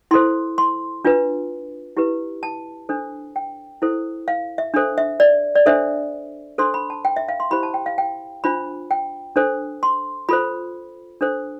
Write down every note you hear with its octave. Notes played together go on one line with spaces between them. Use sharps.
E4 A4 C5 C6
C6
D4 F4 B4
E4 G4 B4
A5
D4 A4 C5
G5
E4 A4 C5
F5
E5
D4 A4 C5
E5
D5
D5
D4 A4 C5 E5
D4 A4 C5 C6
B5
A5
G5
E5
F5
C6
E4 G4 C5 B5
A5
G5
F5
G5
D4 F4 C5 B5
G5
D4 A4 C5
C6
F4 A4 C5 B5
D4 A4 C5